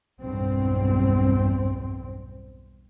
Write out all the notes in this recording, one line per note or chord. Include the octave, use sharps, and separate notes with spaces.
B1 E2 G2 C4